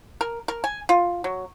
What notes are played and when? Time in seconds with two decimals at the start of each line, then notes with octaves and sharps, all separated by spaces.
0.21 A#4
0.48 A#4
0.64 G#5
0.89 F4
1.24 F#3